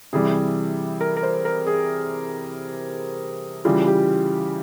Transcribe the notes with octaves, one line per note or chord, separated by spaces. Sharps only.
C3 E3 G3 G#4
A#4
A#4
C5
A#4
G#4
C#3 E3 G3 F4
G4